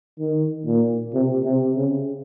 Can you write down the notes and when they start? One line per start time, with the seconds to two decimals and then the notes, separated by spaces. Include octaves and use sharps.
0.19 D#3
0.66 A#2
1.13 C3
1.44 C3
1.76 C#3